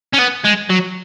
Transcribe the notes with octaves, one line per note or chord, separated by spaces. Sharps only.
C#4
B3
G#3
F#3